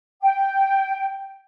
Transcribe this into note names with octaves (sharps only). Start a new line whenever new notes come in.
G5